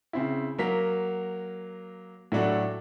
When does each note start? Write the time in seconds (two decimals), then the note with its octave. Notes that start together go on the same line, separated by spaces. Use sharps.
0.13 C#3 C4 E4
0.58 F#3 A#3 A#4 B6
2.32 A2 F#3 A3 D4 F#4 A4